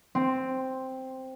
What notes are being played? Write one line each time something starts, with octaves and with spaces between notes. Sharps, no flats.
C4